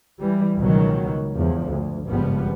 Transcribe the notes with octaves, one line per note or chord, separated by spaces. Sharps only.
E3 G3
C#2 B2 D#3 F#3
E2 G2 F3
D2
G#1 C#2 G2 F3 G3 B3